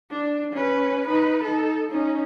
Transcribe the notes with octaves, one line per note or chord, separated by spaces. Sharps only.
D4
C#4 B4
D#4 B4
D#4 A4
C#4 D#4